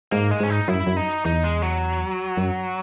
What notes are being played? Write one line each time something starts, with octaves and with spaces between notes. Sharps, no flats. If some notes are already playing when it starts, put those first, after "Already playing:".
G#2 A#3
G#3
G#2 C#4
D#4
F#2 E4
F#2
D#4
E2 D#4
G#3
F#3
F#2